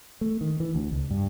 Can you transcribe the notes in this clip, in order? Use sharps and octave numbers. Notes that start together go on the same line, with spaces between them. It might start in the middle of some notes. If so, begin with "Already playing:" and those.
A3
D#3
E3
D2
C#2
G2